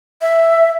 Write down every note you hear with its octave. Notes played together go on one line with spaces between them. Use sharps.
E5